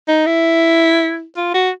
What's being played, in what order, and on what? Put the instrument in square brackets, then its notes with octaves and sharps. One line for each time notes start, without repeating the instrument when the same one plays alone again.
[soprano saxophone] D#4
E4
F4
F#4